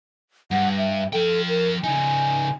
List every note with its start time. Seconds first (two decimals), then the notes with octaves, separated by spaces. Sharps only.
0.51 G2 F#5
0.78 E5
1.13 F3 A4 G5
1.49 A#4
1.84 C#3 D#4 G#5